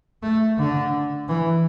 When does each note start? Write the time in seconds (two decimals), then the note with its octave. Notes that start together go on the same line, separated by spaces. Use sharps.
0.22 A3
0.58 D3
1.28 E3